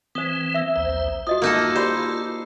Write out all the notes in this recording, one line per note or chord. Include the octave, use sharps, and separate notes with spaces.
E3 C4 C5 D#6
E5 E6
A#1 D#2 C5
F4 F#4 D#5 D#6
A#3 D#4 A4
G4 C5 D5 B5